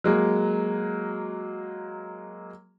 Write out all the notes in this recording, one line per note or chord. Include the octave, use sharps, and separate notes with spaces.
F#3 G#3 A#3